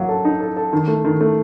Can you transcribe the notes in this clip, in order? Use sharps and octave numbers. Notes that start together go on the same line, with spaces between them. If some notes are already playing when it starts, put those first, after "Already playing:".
Already playing: F#3 A#3
A4
D#4
A4
A4
D#3
A3
D#3
A3